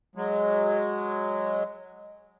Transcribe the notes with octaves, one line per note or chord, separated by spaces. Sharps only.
F#3 G#3